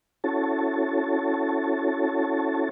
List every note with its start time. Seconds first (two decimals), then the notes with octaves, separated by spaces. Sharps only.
0.24 C#4 E4 F#4 A4 C#5 A5